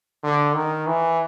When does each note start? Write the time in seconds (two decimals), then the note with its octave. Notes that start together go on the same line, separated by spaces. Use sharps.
0.24 D3
0.55 D#3
0.87 E3